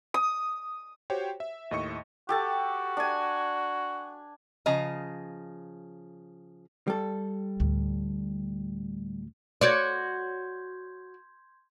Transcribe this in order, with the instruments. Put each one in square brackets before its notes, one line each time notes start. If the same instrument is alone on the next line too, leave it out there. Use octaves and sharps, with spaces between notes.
[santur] D#6
[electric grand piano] F#4 G4 C5 C#5 G5
E5
D#2 A2 D#5 E5 C#6 C#7
[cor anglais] F#4 [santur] G4 A4 A5
[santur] D4 G#5
[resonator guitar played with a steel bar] C#3 F3 D#5 A#5
[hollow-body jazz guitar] G3 A4
[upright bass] D2 A2
[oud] F#4 C#5 D5 [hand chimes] C6 G6 G#6